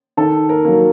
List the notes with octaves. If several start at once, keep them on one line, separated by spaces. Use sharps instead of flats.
D#3 A4
A#4
F#3 A#3